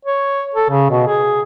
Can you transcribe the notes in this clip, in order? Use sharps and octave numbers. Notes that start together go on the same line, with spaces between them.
C#5
A4
C#3
B2
G#4